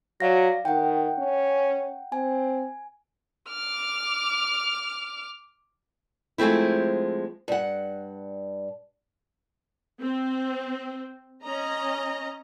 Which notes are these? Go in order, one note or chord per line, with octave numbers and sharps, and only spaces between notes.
F#3 D5 F5 A#6
D#3 F#5 G5
C#4
C4 G#5
D6 F6
F3 G#3 A3 C4 E4
G2 F#5
C4
C#4 D#5 A#5